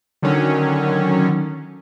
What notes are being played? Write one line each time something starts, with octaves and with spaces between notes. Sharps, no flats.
D3 D#3 F#3 C#4